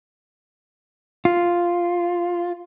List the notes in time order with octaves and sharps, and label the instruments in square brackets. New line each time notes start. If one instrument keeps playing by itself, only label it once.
[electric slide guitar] F4